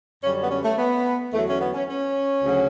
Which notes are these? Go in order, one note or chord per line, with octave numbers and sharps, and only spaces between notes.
F#2 D3 G3 C#4
B3
C#4
A3
B3
E2 D3 F#3 A3
C#4
B3
C#4
C#4
D2 C#3 F#3